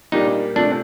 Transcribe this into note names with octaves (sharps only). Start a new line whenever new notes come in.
A#2 G3 A#3 D4 D#4 G4
C3 F3 A3 D4